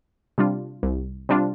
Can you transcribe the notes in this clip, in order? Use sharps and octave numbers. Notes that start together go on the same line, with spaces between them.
C3 G3 D4 F4
C2
C3 G3 D4 F4